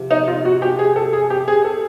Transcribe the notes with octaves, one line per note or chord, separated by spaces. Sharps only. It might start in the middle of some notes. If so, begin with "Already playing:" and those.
Already playing: C3 F3
D#4
F4
F#4
G4
G#4
A4
G#4
G4
G#4
A4